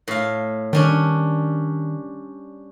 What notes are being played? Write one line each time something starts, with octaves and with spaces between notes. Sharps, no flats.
A2 F5
D#3 G3 C#4 D4